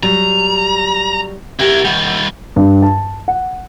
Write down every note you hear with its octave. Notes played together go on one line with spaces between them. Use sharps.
F#3 G3 A#5
E4 F#4 G4 A#4 E5
D#3 G3 F#5
G2
A5
F#5